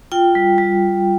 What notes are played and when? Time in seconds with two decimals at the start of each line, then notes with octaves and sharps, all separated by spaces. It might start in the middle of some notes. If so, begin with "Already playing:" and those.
0.12 F4 G5
0.35 G3
0.58 G3